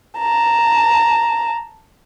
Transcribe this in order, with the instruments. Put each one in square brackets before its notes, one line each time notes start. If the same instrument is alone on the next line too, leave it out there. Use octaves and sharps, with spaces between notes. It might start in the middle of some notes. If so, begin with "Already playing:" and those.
[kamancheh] A5 A#5